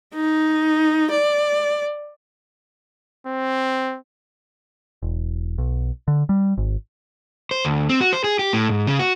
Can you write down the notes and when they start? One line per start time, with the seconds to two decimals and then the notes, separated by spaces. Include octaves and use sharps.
0.14 D#4
1.11 D5
3.27 C4
5.02 E1
5.58 B1
6.08 D3
6.29 G3
6.58 G#1
7.51 C5
7.65 D2
7.89 C4
8.01 F#4
8.13 C5
8.24 G#4
8.39 G4
8.53 A2
8.69 G#2
8.87 C#3
8.99 F#4